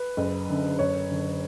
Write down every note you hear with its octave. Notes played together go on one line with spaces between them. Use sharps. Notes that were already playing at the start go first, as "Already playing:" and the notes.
Already playing: B4
F#1
F#2 D3
F#1 C#5
F#2 D3